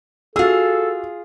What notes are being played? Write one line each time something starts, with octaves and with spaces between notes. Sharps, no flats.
F4 F#4 G#4 A4 E6